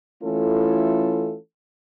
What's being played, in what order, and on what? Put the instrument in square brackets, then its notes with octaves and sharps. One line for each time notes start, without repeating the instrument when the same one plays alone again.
[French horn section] E3 A3 C#4 E4 F4 A4